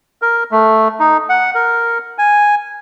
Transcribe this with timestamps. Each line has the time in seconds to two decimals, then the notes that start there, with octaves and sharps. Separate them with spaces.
0.22 A#4
0.52 A3
1.00 D#4
1.29 F#5
1.55 A#4
2.18 G#5